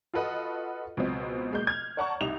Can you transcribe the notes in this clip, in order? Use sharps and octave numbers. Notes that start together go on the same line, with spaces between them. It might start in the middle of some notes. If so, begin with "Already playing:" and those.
F4 F#4 A4 B4 D#5 F#5
C#2 B2 F#3 B3 C4
B2 G#3 A#3 G6
F6 G#6
C#5 D5 F#5 A5 A#5 C#6
C2 D#4 G4 F7